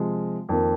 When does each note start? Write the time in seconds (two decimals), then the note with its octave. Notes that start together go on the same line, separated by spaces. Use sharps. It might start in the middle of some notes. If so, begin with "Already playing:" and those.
Already playing: C3 F3 G#3
0.49 F2 D#3 A#3